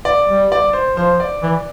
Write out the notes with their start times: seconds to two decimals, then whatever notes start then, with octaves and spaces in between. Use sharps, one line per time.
0.05 D5
0.28 G3
0.52 D5
0.73 C5
0.96 F3 C5
1.20 D5
1.43 E3